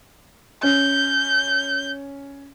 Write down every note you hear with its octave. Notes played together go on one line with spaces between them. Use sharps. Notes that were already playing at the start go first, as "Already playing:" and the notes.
C#4 G6